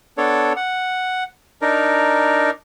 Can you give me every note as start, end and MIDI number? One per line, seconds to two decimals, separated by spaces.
0.18 0.53 59
0.18 0.53 62
0.18 0.53 69
0.18 0.53 73
0.57 1.24 78
1.62 2.51 62
1.62 2.51 63
1.62 2.51 70